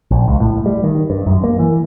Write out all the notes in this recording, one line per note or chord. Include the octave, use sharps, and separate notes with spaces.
A#1
C#2
A2
G3
D#3
G2
F#2
A#3
E3